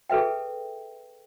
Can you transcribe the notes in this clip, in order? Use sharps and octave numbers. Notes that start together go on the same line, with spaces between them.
G#4 A4 B4 E5 G5